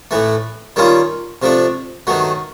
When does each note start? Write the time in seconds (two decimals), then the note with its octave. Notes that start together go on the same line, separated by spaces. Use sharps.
0.11 A2 E3 A3
0.76 D#3 G3 A#3 C#4 F4
1.42 C3 F3 A3 D4
2.07 G2 D#3 F#3 A3